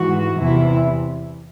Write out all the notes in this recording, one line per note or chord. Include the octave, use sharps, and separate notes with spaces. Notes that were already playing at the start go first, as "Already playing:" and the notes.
Already playing: G#2 E3 F#4
E2 C3 E3 E4